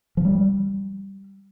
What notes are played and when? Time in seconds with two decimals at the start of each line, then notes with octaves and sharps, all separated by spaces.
0.17 F3
0.25 G3